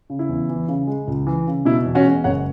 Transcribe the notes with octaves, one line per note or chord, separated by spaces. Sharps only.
C#3
E4
E2
E3
C#3
G#3
C#2
E3
C#3
B2 E4
E2
C#4 F#4
G#3
F#1 C#5 F#5